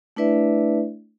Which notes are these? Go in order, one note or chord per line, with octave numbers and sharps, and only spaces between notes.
A3 D4 E4 B4 D5 E5